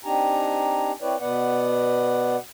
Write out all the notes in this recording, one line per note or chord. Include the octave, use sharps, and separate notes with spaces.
C4 D4 D#4 G4 G#5 A#5
C4 E4 B4 C#5 D5
B2 B3 B4 D5 F#5